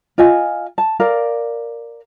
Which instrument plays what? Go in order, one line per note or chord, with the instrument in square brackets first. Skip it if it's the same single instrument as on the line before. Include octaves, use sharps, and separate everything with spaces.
[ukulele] F4 D#5 G#5
A5
A#4 D5 F5